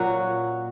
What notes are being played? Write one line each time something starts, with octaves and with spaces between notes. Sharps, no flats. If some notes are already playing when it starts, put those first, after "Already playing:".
Already playing: A#2 F#3 C#4 F#4